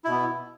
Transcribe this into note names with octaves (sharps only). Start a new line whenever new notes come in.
B2 B3 E4